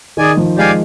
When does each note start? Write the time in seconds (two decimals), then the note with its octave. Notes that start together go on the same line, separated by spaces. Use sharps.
0.17 D#3 G#4 D5 G#5
0.37 F3
0.57 G#3 G4 D5 F5 G#5